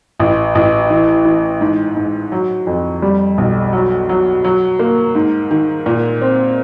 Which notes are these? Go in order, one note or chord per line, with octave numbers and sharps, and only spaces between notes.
A1
A1
E3
E3
G#2
G#2
F#3
F2
G3
B1
F#3
F#3
F#3
A#3
G#2
D#3
A#2
C4